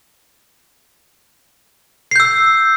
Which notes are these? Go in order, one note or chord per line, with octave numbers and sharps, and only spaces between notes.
E6 G6 C7